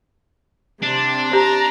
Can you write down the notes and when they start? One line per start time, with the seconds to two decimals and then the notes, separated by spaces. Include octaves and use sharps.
0.83 C3 D4
1.33 G4 A#5